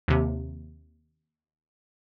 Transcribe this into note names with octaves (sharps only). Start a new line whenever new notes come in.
D#2 C3